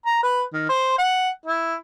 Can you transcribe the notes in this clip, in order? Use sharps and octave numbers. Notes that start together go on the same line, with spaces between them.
A#5
B4
D#3
C5
F#5
E4